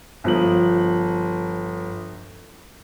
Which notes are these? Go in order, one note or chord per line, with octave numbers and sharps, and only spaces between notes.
G1 F3 F#7